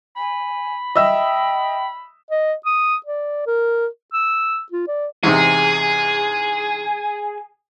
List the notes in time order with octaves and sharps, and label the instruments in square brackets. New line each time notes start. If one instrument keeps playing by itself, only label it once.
[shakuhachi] G#5 [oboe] B5
[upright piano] D#5 E5 E6 [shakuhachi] G5
[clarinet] D#5
D#6
D5
A#4
E6
F4
D5
[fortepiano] E2 G#2 C3 [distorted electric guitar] G#4